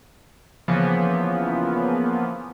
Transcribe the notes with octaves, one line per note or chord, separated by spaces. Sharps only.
C#3 E3 F3 A#3 B3